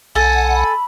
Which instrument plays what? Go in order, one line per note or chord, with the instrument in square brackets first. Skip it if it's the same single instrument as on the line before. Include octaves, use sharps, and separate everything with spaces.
[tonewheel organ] B1 F#5 [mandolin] A4 [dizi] G#5
[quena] B5